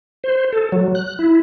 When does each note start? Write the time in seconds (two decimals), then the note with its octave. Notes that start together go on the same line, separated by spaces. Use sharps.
0.24 C5
0.53 A4
0.72 F#3
0.95 F#6
1.19 E4